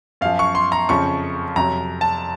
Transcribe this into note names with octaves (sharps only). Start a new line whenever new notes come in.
F#2 F3 F5
C#6
C6
A#5
F2 C#3 F3 C#6
F2 C3 F#3 A#5
A5